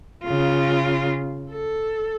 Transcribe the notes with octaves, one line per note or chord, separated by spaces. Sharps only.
C#3 F4
A4